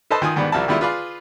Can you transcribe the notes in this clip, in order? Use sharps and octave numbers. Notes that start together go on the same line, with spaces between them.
A4 B4 C5 D#5 A5
D#3 F4 G#5 D#6
G#2 D#3 G3 B3 D4
C2 F3 G3 A#4 E5 A5
D#3 G3 G#3 B3 E4 F4
F4 G#4 B4 D5 F5